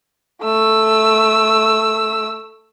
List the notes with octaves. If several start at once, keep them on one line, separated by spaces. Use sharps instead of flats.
A3 E6